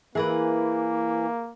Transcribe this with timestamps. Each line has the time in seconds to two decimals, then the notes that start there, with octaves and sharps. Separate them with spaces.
0.15 E3 A#3 G#4 A#4 B4